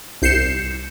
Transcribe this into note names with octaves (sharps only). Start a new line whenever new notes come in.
C2 G6 C7 C#7 E7